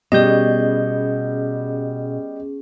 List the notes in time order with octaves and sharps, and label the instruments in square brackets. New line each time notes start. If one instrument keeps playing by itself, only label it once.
[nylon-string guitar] B2 [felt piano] G3 [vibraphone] C#4 G#4 [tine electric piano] D#5 G6